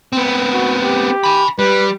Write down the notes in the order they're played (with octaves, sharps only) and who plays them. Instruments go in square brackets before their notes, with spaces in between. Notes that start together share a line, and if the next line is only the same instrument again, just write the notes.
[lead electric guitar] B3 C4
[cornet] F#4
G4
[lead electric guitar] G#5 B5
[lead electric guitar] G3 [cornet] B4